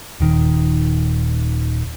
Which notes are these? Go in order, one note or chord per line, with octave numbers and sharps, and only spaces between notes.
D#1 D#3